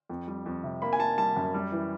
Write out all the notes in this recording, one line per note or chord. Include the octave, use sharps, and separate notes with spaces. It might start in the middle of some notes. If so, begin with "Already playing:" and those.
F2
G3
F2
C3
A#3 B5
G#5
A#3 A5
G3 A5
F#2
G3
E3